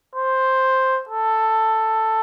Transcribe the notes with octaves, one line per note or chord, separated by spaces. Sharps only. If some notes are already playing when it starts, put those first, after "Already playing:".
C5
A4